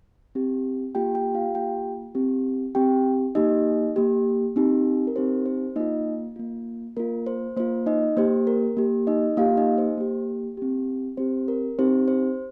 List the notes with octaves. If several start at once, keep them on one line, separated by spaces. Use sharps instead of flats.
C4 G4
A#3 F4 G4 G5
G4 G5
F4 F5
A#3 F4 G4 G5
C4 G4
C4 G4 G5
A#3 D#4 G4 D#5
A#3 G4
C4 D#4 G4
A#4
C4 D#4 G4 C5
C5
A#3 D#4 F4 D#5
A#3 F4
A#3 F4 A#4
C5
A#3 F4 C5
D#4 D#5
A#3 G4 C5
A#4
A#3 G4
D#4 D#5
A#3 F4 G4 F5
D#4 D#5
C5
A#3 G4
C4 G4
C4 G4 C5
A#4
C4 D#4 G4 C5
C5